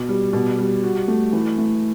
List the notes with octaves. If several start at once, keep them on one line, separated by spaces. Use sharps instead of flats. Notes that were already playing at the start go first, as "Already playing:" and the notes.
Already playing: B2
G3
B2
G3
F#4
A3
E3
A3